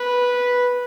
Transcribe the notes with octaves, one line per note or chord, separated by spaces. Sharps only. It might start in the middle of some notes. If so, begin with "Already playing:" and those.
Already playing: B4